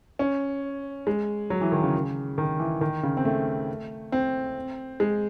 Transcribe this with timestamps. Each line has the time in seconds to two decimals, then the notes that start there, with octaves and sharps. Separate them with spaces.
0.19 C#4
1.07 G#3
1.50 F#3
1.61 E3
1.72 D#3
1.83 C#3
2.38 D#3
2.59 E3
2.81 D#3
3.03 C#3
3.17 C4
3.25 A3
4.12 C4
5.00 G#3